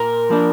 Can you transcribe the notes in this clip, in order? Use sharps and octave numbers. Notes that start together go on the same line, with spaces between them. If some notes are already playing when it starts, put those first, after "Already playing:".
Already playing: A#2 A#4
F3 A#3 D4